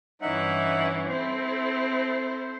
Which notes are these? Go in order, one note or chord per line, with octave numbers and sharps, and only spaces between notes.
G2 E3 C#4 D#4 E5 F#5
C4 E4 A4 C5